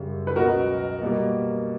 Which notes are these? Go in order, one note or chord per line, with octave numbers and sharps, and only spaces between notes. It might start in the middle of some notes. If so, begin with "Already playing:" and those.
Already playing: F#2 C#3 G3
B4
C#2 B2 F#3 B3 F#4 A#4
B2 G3 A#3